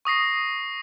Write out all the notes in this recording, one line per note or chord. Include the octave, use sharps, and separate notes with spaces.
C#6 D#6 A#6 C7